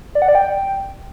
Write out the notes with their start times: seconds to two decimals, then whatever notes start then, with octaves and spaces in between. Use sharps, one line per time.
0.15 D5
0.22 F#5
0.28 D5
0.35 G5